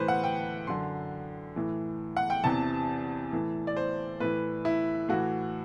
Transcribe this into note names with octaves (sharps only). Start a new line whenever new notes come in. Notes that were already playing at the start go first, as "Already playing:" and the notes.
Already playing: A2 E3 B4 C5
F#5
G5
F#2 D3 C6
A2 E3
F#5
G5
E2 C3 E3 A5
A2 E3
D5
C5
A2 E3 B4
E4
A2 E3 F#4